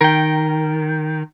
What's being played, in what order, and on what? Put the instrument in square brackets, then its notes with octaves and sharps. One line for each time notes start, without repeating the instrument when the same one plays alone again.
[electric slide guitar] D#3 [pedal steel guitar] A#4 G5